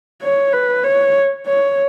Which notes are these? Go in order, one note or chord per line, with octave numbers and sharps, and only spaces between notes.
C#5
B4
C#5
C#5